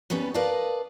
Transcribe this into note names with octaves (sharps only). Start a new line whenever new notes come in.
D#2 G3 B3 C#4 B4
A#4 B4 D5 D#5 F5 A5